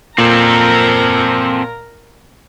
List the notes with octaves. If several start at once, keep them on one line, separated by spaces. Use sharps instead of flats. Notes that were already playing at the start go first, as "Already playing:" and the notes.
A#2 C4 A4 A#4 A#5